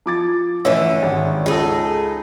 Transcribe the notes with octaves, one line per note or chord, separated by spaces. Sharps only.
F3 D6 A6
A1 D3 E3 C#4 E5
G#1
C#2 D#4 G#4 A4